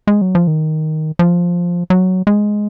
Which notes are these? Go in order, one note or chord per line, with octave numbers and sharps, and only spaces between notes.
G#3
F#3
F3
D#3
F3
F#3
G#3